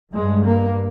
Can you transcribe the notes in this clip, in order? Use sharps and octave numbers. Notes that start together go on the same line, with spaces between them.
G2 G#3
A#3